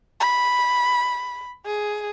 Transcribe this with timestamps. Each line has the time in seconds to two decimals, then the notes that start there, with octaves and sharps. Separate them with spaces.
0.20 B5
1.66 G#4